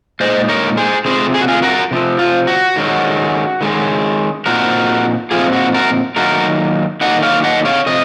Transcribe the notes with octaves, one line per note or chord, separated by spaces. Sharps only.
A#2 G#3 D#4 C5 D#5
A#4 C#5
G#4 C5
C3 F3 C4 G#4 C5
G#4
F#4
F4 G#4
F#4 A#4
C3 F3 C4
F4
F#4
D#3 G#3 C#4
D#3 G#3 C#4
A#2 F3 C4 D#4 F#4 A#4
A#2 F3 C4 D#4 F4 G#4
F#4
F#4 A#4
D#3 F#3 A#3 D#4 F#4 A#4
D#3 F#3 A#3 D#4 D#5 F#5
C#5 F5
D#5 F#5
C#5 F5
C3 F3 D#5